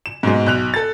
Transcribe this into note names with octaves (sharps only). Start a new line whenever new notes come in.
E7
G#2 B2 G#3
B1 F#6 F7
A4 A6